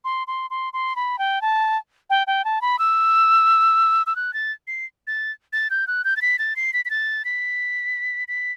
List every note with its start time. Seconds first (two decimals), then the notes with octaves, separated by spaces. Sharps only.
0.05 C6
0.27 C6
0.50 C6
0.73 C6
0.96 B5
1.19 G5
1.41 A5
2.10 G5
2.27 G5
2.45 A5
2.61 B5
2.79 E6
4.06 E6
4.16 F#6
4.33 A6
4.67 C7
5.07 A6
5.53 A6
5.70 G6
5.87 F#6
6.05 G6
6.16 A6
6.22 B6
6.39 A6
6.56 C7
6.73 B6
6.85 B6
6.90 A6
7.25 B6
8.28 B6